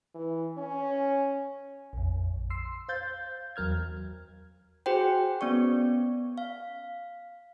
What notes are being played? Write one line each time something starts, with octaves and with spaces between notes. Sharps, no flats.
E3
C#4
A#1 F2
C6 E6 C7
C5 F5 G6 A6
E2 F#3 A#4 F6 G#6
F#4 G#4 C5 G5
B3 C#4 D5 C#6
F5